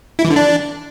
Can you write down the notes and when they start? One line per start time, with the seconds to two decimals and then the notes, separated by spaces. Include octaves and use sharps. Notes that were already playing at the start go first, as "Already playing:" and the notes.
0.19 E4
0.25 E3
0.30 D3
0.36 D4